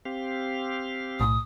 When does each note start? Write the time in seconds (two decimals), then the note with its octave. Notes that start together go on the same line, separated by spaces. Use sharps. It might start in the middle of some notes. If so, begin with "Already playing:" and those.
0.05 C4 G4 F5
1.20 B1 A2 D#6